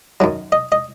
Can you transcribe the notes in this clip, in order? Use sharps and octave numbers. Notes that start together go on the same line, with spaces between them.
F#2 D#3 F#3
D#5
D#5